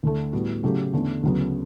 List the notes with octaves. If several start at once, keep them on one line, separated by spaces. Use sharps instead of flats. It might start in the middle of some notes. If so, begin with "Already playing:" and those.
D2 D3 A3
A2 G3 B3 F#4
C#3 F#3 A3 C#4 G4
E2 D3 A3 C#4
D2 C#3 F#3 B3